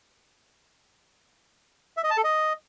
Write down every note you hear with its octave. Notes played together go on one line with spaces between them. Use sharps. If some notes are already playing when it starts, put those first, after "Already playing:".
E5
D#5
A5
A4
D#5